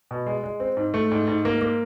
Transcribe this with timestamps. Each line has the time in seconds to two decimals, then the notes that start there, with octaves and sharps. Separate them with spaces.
0.11 B2
0.26 G#3
0.44 G#3
0.60 C4
0.77 G#2
0.94 A3
1.11 G#2
1.28 G#2
1.45 A#3
1.61 A#3